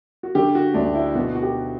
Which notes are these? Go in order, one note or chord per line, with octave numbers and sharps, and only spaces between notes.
F#4
D3 G4
F#4
D2 D4
E4
B2 F#4
F#4
G4